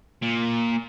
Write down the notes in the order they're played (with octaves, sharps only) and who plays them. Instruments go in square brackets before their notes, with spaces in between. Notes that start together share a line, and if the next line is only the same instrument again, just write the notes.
[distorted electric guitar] A#2